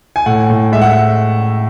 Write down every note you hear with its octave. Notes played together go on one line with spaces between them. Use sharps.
G#5
A2 F#5
A2
G#3 E5
F#5
E5